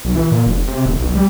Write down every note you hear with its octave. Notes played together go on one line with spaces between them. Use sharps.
B1
E3
A#2
F1
C3
D#1
B1
G3